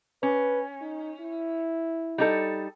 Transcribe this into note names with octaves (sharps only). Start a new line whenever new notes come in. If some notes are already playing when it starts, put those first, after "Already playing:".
C#4 B4
D#4
E4
G3 D#4 A4